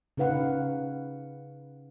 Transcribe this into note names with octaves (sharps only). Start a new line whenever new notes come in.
C#3 D#4 B4 F5 F#5